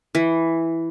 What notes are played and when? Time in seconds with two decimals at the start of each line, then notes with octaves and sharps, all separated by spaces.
0.15 E3